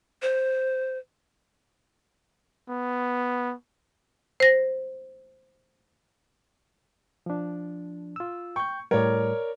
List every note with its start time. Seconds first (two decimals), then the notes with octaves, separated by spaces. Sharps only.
0.22 C5
2.69 B3
4.40 C5 A#6
7.26 F3 D4
8.16 F4 E6
8.56 G5 C#6 G6
8.91 A2 G3 A#4 C#5 D5